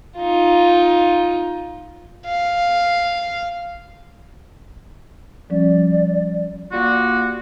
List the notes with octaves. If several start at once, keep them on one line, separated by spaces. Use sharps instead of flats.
D#4 F4
F5
F3 G3 C#4 D5
G3 A#3 F4 F#4